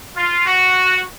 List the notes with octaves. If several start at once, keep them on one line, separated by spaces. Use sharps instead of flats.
F4
F#4